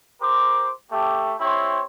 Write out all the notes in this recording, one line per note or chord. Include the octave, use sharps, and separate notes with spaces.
G4 A#4 C5 C6 D6
A3 G4
C4 E4 G4 C5 C#5 C6